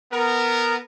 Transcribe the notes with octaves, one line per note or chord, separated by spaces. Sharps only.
B3 A#4